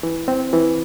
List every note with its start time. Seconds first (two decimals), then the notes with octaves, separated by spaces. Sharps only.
0.03 E3
0.28 C4
0.53 E3